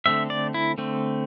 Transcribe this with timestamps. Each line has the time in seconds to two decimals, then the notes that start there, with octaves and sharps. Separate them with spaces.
0.06 D3 A3 C4 E5
0.30 D5
0.54 E4
0.78 D3 A3 C4